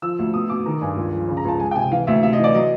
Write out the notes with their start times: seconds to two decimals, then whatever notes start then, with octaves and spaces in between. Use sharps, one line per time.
0.02 F3 E6
0.19 D2
0.34 B2 D#6
0.49 B2 D6
0.66 D#3 A#5
0.81 G2 G#5
0.97 C#2
1.13 F3
1.28 C#3
1.37 A#5
1.45 C#2 A5
1.60 G#3 G#5
1.71 G5
1.76 C3 G#5
1.91 E3 F5
2.07 D2 E5
2.23 C3 E5
2.33 D#5
2.39 E3 D5
2.55 F#3 D#5